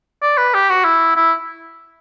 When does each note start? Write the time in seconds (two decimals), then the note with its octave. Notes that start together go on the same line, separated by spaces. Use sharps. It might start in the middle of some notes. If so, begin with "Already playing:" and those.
0.22 D5
0.37 B4
0.54 G4
0.69 F#4
0.84 E4
1.16 E4